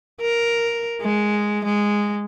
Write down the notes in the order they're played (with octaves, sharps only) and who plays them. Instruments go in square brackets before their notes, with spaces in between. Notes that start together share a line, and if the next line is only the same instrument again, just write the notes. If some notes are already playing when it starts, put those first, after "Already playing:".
[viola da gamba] A#4
G#3
G#3